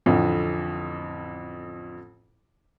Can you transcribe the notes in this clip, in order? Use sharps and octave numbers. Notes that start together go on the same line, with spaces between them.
A1 F2 D3